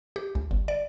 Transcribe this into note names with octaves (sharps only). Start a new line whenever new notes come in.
G4
C#2
G1
D5